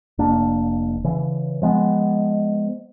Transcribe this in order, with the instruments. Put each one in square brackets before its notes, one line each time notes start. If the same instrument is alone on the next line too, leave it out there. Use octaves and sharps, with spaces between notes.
[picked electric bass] F1 A#3 D4
C#3 E3
F3 G#3 A#3 B3